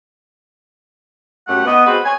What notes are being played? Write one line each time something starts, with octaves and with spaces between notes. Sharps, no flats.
F#2 A3 G4 F#5
B3 D#5
G#3 C4 F#4 B4
C#5 G#5